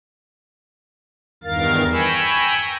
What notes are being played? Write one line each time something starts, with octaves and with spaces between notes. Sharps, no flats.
E2 G2 D#3 A#4 F5 A6
G5 G#5 A#5 B5 C#6 E6